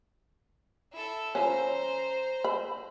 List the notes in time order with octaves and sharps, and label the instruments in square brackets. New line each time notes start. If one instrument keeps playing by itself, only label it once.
[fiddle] E4 A4
[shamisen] F3 C#4 [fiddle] C5 A#5
[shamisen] B5